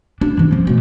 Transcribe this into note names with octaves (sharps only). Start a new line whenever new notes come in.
C#2 D4
C3 E3
F3 C4
B2 A3